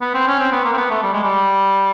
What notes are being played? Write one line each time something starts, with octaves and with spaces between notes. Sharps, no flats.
B3
C4
C#4
C4
B3
A#3
C4
B3
A3
G3
G#3
G3